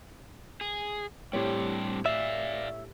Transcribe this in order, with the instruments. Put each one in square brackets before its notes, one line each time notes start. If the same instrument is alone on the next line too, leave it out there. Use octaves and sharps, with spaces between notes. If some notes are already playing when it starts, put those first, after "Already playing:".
[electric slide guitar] G#4
[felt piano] A2 G4 C#5 [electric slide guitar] G3 C4 D4
[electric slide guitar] D5 F5 [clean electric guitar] E5